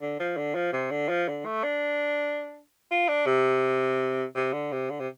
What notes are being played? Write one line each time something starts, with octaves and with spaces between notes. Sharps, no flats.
D3
F3
D3
F3
C3
D3
F3
D3
A3
D4
F4
D4
C3
C3
D3
C3
D3
C3